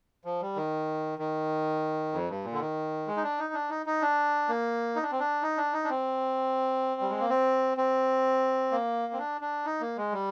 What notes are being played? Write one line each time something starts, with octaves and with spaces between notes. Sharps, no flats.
F3
G3
D#3
D#3
F2
G2
A#2
D3
D#3
G#3
D#4
D4
D#4
D4
D#4
D#4
D4
A#3
D#4
D4
C4
D4
D#4
D4
D#4
D4
C4
G3
G#3
A#3
C4
C4
A#3
C4
D4
D4
D#4
A#3
G#3
G3